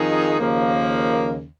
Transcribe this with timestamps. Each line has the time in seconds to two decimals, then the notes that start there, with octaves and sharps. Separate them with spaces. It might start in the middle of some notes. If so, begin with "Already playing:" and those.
Already playing: F2 D#3 G#3 D#4 G#4
0.38 D#2 C#3 F3 A#3